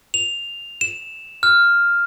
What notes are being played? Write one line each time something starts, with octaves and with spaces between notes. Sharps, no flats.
F7
E7
F6